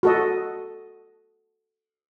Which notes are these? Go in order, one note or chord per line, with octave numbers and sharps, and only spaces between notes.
F#4 A4 D#5